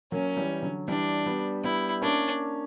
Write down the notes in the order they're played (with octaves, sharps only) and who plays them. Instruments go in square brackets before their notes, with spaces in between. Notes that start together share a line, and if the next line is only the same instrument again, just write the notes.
[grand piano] F#3 A#3 [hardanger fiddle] C#4
[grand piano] E3 G3
D3 F#3
[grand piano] E3 G3 [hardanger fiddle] D4
[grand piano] G3 B3
[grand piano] G3 B3 [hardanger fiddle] E4
[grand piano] A#3 C#4 [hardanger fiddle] D4